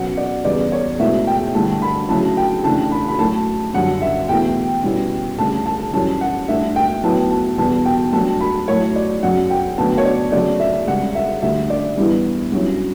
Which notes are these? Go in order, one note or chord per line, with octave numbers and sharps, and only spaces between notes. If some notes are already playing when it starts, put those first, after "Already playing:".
Already playing: B2 F#3 C#4 F#5
D5
E2 C#3 G3 B3 D5
C#5
C#2 B2 A3 E4 E5
G5
G2 D3 A3 E4 A5
B5
D2 C#3 F#3 C#4 E4 A5
G5
C#3 E3 A3 D4 A5
B5
B5
A2 F#3 A3 A5
F#2 D3 G3 C#4 F#5
E5
E2 B2 A3 E4 G5
B2 G3 C#4 E4
D2 C#3 G3 A5
A5
F#2 E3 G3 C#4 A5
F#5
A2 G3 D4 E5
G5
A2 F#3 B3 E4 A5
A5
E2 B2 G3 B3 A5
G5
G2 F#3 A3 D4 A5
B5
A2 F#3 A3 E4 C#5
D5
F#2 C#3 F#3 F#5
G5
D2 D3 F#3 B3 A5
C#5
D5
D2 C#3 F#3 A3 D5
E5
C#2 C#3 G3 F#5
E5
D2 D3 G3 E5
D5
G2 E3 G3 B3 E4
G2 F#3 C#4 E4